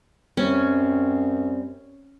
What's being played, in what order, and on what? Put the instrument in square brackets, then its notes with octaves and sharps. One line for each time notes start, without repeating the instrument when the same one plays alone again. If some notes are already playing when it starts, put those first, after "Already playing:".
[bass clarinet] F#2 [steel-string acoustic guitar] G3 C4 [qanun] C#4